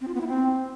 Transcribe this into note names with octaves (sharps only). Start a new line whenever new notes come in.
C4
F4
B3
E4
C4